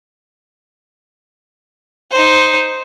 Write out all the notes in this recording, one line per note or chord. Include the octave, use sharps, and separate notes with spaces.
D#4 C5